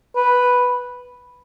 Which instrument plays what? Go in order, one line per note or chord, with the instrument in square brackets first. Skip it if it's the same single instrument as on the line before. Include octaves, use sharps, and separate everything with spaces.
[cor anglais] B4